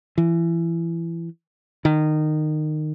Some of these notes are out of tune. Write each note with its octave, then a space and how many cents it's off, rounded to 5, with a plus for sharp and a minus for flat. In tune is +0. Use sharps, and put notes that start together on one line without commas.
E3 +25
D#3 -20